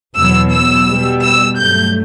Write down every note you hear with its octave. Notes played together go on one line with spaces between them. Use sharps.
E2 B2 F#3 E6
E6
B2 G3
E6
G2 F#3 A3 G6